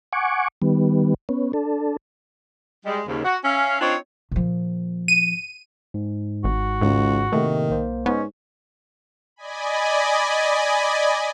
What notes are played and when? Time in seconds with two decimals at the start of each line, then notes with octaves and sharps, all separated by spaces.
0.13 F#5 G#5 C#6 D6
0.62 D#3 G3 B3
1.29 B3 C#4
1.53 D4 A4
2.86 G3 G#3
3.07 D#2 G#2 C#3
3.25 F#4
3.44 C#4 E5 F5
3.81 C4 D4 D#4 F4 C5 C#5
4.31 A#2 F3
5.08 D#7
5.94 G#2
6.44 G#1 F#4
6.81 G#1 C#2
7.32 A2 C3 D#3 A3 A#3
7.70 B1 A#3 C5
8.06 G#2 B3 C#4 C5 D#5
9.36 D5 D#5 G#5 B5